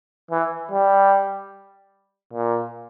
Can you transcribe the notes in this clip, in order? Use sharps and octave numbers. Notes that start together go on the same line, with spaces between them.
E3
G3
A#2